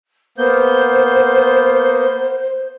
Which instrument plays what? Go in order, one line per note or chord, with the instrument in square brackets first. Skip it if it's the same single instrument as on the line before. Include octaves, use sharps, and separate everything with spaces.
[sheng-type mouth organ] A#3 B3 G6 [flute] C5